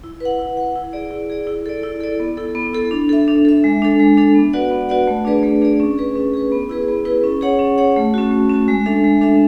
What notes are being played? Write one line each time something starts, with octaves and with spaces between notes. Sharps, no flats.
E4
B4 F#5
E4
B4 F#5
E4
G#4 D5
E4
G#4 D5
E4
A4 D5
E4
A4 D5
B3
E4 A4
B3
E4 A4
D4
A4 E5
D4
A4 E5
G#3
D4 A4
G#3
D4 A4
B3
F#4 B4 D5 F#5
B3
F#4 B4 D5 F#5
A3
D4 G#4 B4 D5
A3
D4 G#4 B4 D5
C#4
G#4 B4
C#4
G#4 B4
B3
E4 G#4 B4
B3
E4 G#4 B4
C#4
G#4 C#5 F#5
C#4
G#4 C#5 F#5
A3
C#4 F#4
A3
C#4 F#4
G#3
D4 A4 E5
G#3
D4 A4 E5